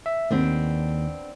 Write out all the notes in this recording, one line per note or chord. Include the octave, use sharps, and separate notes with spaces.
E5
D#2 D#3 B3 C4 D4